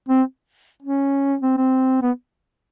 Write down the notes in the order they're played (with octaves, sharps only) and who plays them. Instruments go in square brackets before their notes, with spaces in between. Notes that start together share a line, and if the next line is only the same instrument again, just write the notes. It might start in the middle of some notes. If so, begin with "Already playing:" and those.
[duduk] C4
C#4
C4
C4
B3